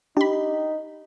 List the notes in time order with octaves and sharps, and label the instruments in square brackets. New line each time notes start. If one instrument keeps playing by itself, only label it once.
[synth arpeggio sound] D4 B5 [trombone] D#4 [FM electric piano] G4